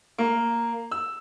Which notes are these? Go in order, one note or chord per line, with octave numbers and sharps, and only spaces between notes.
A#3
E6